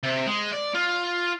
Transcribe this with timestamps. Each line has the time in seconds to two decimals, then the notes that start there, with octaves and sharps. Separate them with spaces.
0.03 C3
0.26 G#3
0.52 D5
0.74 F4